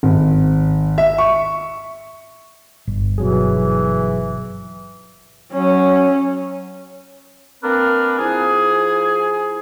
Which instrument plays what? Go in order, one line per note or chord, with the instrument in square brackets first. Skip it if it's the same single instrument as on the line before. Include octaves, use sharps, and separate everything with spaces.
[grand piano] G#1
E5
C#6
[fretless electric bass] G1
[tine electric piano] B2 F#3 G#4 [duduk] E3
[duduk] F#3 [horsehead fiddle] C#4
[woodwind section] A#3 C4 D4 A#4 B4
F3 E4 G#4